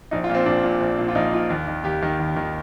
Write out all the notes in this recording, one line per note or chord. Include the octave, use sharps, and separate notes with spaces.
A#1 D#4
F4
A#2
C4
A#1 D4
A#2
A#1
A#2
F4
A#1 D#4
A#2 F4
D#2
D#3
D#2 G4
D#3
D#2
D#3